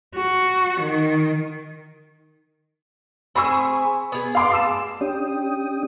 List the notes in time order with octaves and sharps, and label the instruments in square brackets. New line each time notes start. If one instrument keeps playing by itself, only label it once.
[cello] F#4
D#3
[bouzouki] C4 G#4 G#5 [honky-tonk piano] B5 C#6 E6
[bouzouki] B3 G#4
[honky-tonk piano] F5 C6 D6
A5 E6 E7
[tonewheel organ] C#4 D4 G4 G5 D#6